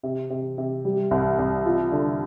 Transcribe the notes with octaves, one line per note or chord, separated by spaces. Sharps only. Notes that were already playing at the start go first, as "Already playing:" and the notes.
C3
C3
C3
G3
C2
C2
F4
D3